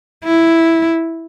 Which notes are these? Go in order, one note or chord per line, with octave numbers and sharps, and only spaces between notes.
E4